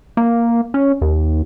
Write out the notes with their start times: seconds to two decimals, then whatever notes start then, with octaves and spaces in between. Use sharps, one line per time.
0.17 A#3
0.74 C#4
1.02 D#2